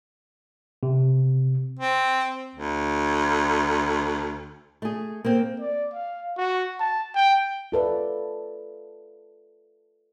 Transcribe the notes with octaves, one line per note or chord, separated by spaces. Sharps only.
C3
C4
D2
A3 G#4
A#3 C4
D5
F5
F#4
A5
G5
F4 A4 B4 D5